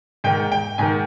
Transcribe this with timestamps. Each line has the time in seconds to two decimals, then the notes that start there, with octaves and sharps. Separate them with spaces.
0.24 G#2 D#3 G5
0.52 G5
0.78 G#2 D#3 G#5